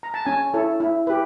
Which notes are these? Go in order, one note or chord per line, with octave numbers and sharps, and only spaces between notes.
A#5
A5
C#4 G#5
E4 A4 C#5
E4
G4 B4